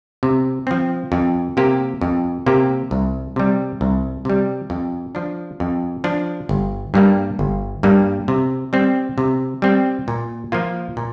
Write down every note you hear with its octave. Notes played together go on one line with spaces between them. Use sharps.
C3
F3 C4
F2
C3 A#3 G4
F2
C3 A#3 G4
C2
C3 G3
C2
C3 G3
F2
F3 D4
F2
F3 D4
G1
G2 G3 A#3
G1
G2 G3 A#3
C3
G3 C4
C3
G3 C4
A#2
F3 A#3 F4
A#2